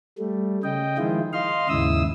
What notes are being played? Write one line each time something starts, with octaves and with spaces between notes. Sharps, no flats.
G3 A3
C#3 D#5 G5
D#3 F3 G#3 E4 F4
D#5 F5 C6 F6
D#2 G#2 C#3 E4 D#6 E6